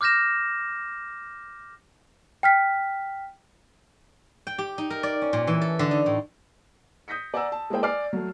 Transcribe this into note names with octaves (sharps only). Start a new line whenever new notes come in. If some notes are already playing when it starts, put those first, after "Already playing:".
D6 F6 G6 A#6 E7
G5 F6 B6
G5
G4
D#4
A#4
D5
C#4
A#2
E3
A4
D3
D#4
A2
D#6 G6 A#6 B6 C#7
D5 F#5 G#5 A#5 E6
A5
G#3 A#3 E4 G#4 C5 G5
D5 G#5 F6 C7
F#3 A3